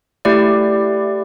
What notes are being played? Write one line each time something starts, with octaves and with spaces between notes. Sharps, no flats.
A3 E4 G4 D5